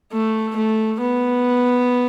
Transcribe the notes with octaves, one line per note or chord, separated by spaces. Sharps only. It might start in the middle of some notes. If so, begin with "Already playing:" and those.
A3
A3
B3